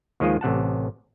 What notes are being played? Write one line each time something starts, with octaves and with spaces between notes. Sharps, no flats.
D#2 D#3 F3 G#3 F4 D#5
A1 C3 F#5 A5